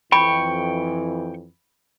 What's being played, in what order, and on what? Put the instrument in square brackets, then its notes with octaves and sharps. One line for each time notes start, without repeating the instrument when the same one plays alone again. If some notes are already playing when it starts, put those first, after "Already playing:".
[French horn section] F2 E3 [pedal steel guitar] G5 C#6 [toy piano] B5